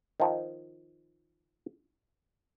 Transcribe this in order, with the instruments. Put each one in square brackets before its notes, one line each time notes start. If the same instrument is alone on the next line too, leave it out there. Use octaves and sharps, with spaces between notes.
[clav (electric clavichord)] D#3 F3